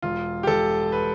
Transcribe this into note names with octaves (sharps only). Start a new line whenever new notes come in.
E1 F4
G4
E1 A4
B4